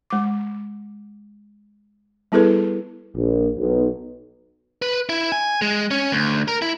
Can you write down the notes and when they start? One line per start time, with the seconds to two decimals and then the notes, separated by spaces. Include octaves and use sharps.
0.10 G#3 D6
2.32 G3 B3 E4 G#4 A4 B4
3.16 A#1
3.58 B1
4.82 B4
5.09 E4
5.32 G#5
5.62 G#3
5.91 C#4
6.12 D2
6.48 A#4
6.62 E4